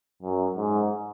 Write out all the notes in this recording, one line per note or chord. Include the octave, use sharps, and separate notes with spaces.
F#2
G#2